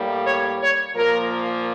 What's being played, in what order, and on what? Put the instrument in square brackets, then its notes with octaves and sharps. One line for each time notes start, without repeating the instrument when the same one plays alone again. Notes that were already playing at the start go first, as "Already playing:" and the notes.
Already playing: [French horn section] A2 G3 A#3
C#5
C#5
A#2 F3 A#3 A#4